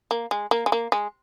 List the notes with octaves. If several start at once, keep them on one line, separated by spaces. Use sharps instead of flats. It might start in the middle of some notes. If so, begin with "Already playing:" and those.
A#3
G#3
A#3
G#3
A#3
G#3